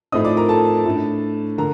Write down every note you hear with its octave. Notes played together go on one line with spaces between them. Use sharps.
A2 F3 A3 C4 D#4 D#5 D#6
D5 D6
A#4 A#5
A4 A5
A2 A3 D4
D3 A#4 A#5